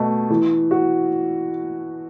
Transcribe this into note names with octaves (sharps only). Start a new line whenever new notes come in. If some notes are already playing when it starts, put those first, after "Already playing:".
Already playing: B2 A3
E3
F#4